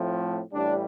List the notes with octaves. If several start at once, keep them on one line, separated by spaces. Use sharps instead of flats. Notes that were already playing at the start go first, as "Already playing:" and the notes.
Already playing: A2 F3 A3 C4
A1 A2 G3 D4